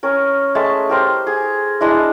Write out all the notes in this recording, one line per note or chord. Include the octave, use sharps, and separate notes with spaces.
C#4 A#4
G#3 A3 A5
G4 A#4 C5
G#4
G#3 D4 E4